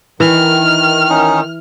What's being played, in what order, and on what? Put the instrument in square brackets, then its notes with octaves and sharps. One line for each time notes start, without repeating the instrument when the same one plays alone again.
[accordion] D#3 [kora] E3 [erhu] F6
[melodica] C#4 D#4